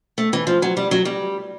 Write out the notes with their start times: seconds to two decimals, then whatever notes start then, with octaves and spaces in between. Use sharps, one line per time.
0.18 A3
0.33 E3
0.47 F3
0.62 F#3
0.77 G3
0.91 F#3
1.05 G3